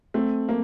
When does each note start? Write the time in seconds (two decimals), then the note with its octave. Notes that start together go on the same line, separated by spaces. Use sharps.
0.14 A3 C4
0.49 A#3